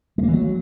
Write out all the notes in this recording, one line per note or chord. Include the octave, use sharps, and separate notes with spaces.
G#3
A#3
E3
F#3